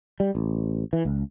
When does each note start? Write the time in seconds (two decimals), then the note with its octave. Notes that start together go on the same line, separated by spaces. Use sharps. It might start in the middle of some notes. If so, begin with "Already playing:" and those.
0.20 G3
0.35 A1
0.93 E3
1.05 C#2